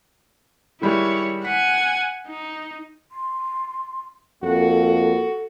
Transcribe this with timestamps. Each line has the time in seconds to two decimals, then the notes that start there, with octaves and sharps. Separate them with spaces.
0.82 D#3 G3 G#3 E4 C#5
1.44 F#5 G#5 B6
2.28 D#4
3.12 C6
4.43 F2 A#3 F#4 A4